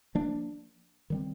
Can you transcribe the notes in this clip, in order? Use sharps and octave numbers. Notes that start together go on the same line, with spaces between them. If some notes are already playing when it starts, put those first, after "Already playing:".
F3 A#3 D4
D#3 G3 C4